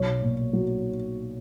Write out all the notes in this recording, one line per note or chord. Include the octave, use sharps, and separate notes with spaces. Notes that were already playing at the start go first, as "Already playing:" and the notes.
Already playing: B1 C#5
A#2
F#3